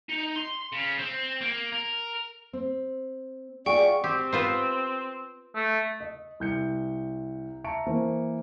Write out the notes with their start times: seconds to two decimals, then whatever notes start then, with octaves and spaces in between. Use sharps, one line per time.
0.09 D#4
0.36 C6
0.72 C#3
0.99 C4
1.41 A#3
1.72 A#4
2.53 C4
3.66 F4 G#4 D5 F#5 G5 C#6
4.04 C4 G4
4.33 B3 F4 C5
5.55 A3
6.00 D#5
6.40 C2 G6 C#7
7.64 E5 A5 A#5 C#6 C#7 D7
7.86 E3 A#3 C5